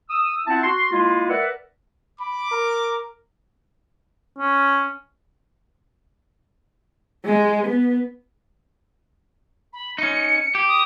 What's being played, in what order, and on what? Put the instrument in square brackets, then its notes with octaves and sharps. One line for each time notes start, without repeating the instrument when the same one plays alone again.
[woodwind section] D#6 E6
C4 E4 F4 E5 F#5 A5
F#4 C6
G#3 A#3 E4 F4
A#4 B4 D5 E5 F#5
[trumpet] B5 [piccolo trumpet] D6
[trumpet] A#4
[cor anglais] C#4
[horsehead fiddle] G#3
B3
[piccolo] B5
[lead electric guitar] C#4 D#4 [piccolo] C#7
[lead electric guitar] G4
[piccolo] D#6